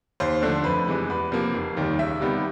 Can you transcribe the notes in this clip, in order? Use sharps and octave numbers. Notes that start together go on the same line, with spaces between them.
D#2 C5
D3 F3 A3 D4
F2 B4
C3 E3 G#3
E2 B4
C3 F3 A#3
F1
D#2 D#3 G3
C#2 E5
C3 D#3 G3 B3